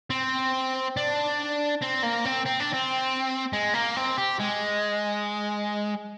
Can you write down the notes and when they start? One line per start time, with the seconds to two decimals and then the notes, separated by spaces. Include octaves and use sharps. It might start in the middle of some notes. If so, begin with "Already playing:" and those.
0.10 C4
0.97 D4
1.82 C4
2.03 A#3
2.25 C4
2.46 C4
2.60 D4
2.73 C4
3.53 G#3
3.74 A#3
3.96 C4
4.17 G4
4.39 G#3